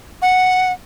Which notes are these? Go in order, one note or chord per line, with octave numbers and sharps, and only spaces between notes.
F#5